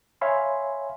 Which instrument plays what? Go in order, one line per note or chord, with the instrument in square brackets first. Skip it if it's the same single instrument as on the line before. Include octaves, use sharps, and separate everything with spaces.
[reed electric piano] C#5 E5 F5 G#5 B5 C6